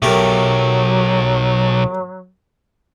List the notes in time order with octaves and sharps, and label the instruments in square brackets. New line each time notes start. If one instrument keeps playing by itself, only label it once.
[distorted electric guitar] B1 [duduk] F#3 [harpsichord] A3 G4 A#4